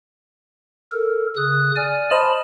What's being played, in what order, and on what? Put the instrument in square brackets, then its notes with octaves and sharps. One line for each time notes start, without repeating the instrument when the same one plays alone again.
[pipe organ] A4 A#4
C#3 D#6 F#6
D5 G#5 F6
[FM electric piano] C5 D#5 [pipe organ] A5 B5